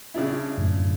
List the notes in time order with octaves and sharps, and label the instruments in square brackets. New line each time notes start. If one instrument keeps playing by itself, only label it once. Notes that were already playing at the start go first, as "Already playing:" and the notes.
[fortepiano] C#3 D4 E4
[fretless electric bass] F#2 A2 D3